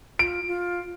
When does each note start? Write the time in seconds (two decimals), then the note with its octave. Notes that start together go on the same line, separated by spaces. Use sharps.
0.19 F4 D7
0.47 F4